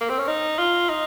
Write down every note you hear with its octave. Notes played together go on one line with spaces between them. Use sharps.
A#3
C4
C#4
D#4
F4
D#4